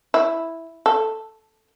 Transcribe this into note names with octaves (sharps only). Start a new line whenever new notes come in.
E4
A4